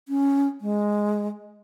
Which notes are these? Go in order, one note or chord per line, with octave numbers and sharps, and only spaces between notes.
C#4
G#3